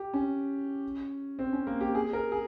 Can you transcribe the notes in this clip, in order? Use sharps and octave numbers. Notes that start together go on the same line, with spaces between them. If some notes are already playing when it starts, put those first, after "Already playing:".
Already playing: G4
C#4
C4
C#4
A#3
G4
G#4
A#4
G#4